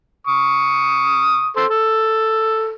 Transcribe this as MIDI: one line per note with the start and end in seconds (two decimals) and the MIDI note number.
0.27 1.51 85
0.27 1.51 87
1.56 1.65 69
1.56 1.65 72
1.70 2.73 69